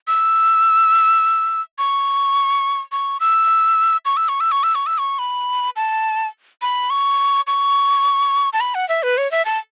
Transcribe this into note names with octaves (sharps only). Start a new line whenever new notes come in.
E6
C#6
C#6
E6
C#6
E6
C#6
E6
C#6
E6
C#6
E6
C#6
B5
A5
B5
C#6
C#6
A5
B5
F#5
E5
B4
C#5
E5
A5